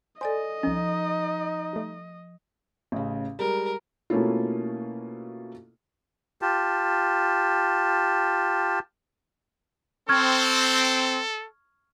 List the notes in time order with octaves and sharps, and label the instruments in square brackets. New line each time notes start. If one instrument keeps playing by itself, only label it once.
[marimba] A4 D5 G#5 [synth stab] C5 [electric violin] D#5
[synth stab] C2 C#4 [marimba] F3 [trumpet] D#4
[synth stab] G3 A3
[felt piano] A1 C#3
[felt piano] G3 G#3 [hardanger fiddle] A#4
[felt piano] B2 A3 A#3 C#4 E4 F4
[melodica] F4 G4 A5
[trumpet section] C4 [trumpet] A4 [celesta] C#6 F6 G#6